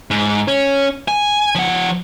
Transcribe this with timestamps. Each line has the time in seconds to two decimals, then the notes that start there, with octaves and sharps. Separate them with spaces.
0.11 G#2
0.48 C#4
1.08 G#5
1.55 F3 F#5